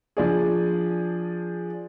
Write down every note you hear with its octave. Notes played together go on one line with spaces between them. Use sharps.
F3 D4 G#4